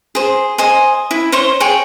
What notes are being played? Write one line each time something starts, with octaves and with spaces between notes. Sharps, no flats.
G#4 C5
C5 D#5 G#5
E4
C5 C#5 C6 C#6
G#4 C#5 G5